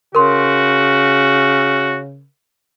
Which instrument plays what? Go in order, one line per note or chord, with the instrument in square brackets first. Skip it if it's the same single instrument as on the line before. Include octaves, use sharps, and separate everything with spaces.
[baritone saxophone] C#3 [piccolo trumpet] F#4 [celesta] A#4 C6